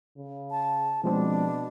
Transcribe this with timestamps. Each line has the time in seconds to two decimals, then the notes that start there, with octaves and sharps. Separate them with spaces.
0.17 C#3
0.51 A5
1.04 B2 F3 G#3 C4 D4